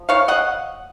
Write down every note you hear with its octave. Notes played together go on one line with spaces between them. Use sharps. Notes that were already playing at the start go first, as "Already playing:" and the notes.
Already playing: F3
C#5 F5
D#5 F#5